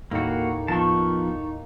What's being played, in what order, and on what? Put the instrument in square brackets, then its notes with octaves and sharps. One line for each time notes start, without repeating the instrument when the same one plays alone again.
[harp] D#2 A2 E4 [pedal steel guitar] A#3 F#4 [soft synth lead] D#4
[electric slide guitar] F3 B3 F4 [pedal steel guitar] A5 C#6